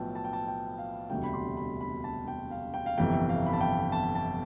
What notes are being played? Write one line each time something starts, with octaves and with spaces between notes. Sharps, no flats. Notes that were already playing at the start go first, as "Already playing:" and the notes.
Already playing: B1 A2 F3 B3 G5 A5
A5
G5
A5
G5
F5
E1 D2 C3 G3 G5
B5
C6
B5
B5
A5
G5
F5
G5
F5
G1 F2 C3 E3 G5
F5
B5
A5
G5
A5
A5